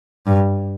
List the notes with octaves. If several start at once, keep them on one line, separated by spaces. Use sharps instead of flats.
G2